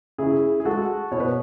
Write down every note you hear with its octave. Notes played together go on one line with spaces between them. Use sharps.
C#3 E4 G#4
G#4
G#3 F#4 A4
B2 C#5
B4